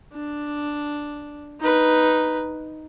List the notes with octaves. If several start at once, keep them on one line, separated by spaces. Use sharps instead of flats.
D4
D#4 B4